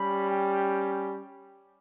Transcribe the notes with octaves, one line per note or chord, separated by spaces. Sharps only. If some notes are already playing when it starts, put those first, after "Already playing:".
Already playing: G3 C#4 G4 B5
G5